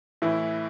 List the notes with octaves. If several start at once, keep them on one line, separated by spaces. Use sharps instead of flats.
A2 E3 E4